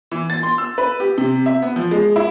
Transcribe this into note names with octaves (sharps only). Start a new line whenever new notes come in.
E3
A6
C6
E6
B4
G4
C3
E5
B3
F3
G#3
E4